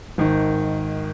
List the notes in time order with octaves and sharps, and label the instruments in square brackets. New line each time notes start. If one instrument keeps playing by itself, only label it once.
[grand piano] G#1 D#3